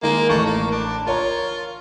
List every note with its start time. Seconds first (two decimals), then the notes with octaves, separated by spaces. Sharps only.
0.03 D#3 G#3 A#3
0.30 A1 A3 C#6
0.46 A#3
0.71 D4
1.07 F4 A#4 C#5 A#5